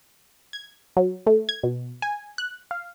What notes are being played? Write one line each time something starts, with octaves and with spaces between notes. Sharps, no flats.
G#6
F#3
A3
G#6
B2
G#5
F#6
F5